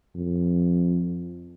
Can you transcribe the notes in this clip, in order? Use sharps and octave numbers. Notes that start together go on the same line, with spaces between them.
F2